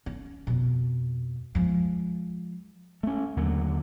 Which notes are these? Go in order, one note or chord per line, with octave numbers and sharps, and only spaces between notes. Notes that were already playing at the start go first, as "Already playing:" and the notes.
C#4
F2 B2
F3 G#3
A3 C#4
D#2 D3 F#3 A#3